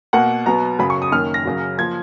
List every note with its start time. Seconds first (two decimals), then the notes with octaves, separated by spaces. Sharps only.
0.13 B2 A#3 F#5
0.46 B2 F#3 B3 A#5
0.79 F#2 C#3 F#3 B5
0.90 C#6
1.02 D#6
1.12 F#2 D#3 A#3 F6
1.34 A#6
1.45 F#2 C#3 F#3
1.78 F3 A#3 G#6